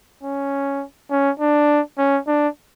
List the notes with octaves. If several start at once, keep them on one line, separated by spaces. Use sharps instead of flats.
C#4
C#4
D4
C#4
D4